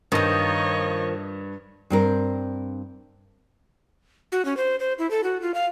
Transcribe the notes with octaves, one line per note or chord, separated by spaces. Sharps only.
G2 D#3 F3 C#5 D#5
G2 C4 A#4
F#4
C#4
C5
C5
E4
A4
F#4
F4
F5